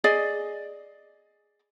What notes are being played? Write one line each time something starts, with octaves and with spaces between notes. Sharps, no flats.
G#4 D5 D#5